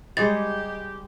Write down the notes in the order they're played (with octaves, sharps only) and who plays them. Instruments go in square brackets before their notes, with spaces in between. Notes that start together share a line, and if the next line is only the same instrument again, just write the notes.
[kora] G3 G#3 C#5 [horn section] G4 [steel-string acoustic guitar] D#5 [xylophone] A6